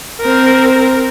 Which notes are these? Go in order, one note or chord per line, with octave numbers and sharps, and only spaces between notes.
C4 A#4